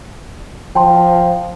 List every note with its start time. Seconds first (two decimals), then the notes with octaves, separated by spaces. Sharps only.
0.75 F3 G5 A5 C6